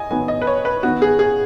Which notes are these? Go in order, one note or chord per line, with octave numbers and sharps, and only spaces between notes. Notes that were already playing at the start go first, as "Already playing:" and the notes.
Already playing: D#5 G#5
D#3 F#3 B3 G#5
D#5
B4
C#5
B4
D#3 B3 F#4
G#4
G#4